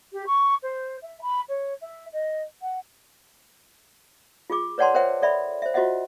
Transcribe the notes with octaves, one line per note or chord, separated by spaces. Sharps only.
G4
C#6
C5
E5
B5
C#5
E5
D#5
F#5
F4 G#4 D6
B4 C#5 D5 F#5 A5 C6
A#4 C5 C#5 E5 F#5 G5
A4 D5 E5 B5
C5 E5
F4 F#4 C5 D#5 E5 F#5